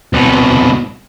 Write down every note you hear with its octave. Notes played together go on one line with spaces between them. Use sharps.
C2 B2